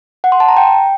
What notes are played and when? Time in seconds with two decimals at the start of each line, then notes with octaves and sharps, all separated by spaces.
0.24 F#5
0.32 C6
0.40 A5
0.49 A#5
0.57 G5